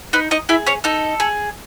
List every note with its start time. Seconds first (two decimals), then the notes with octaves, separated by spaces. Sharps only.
0.13 D#4 B4
0.31 D#4 D#5
0.49 E4 G#4 E5
0.66 C#4 C#5
0.84 D#4 A4
1.20 G#4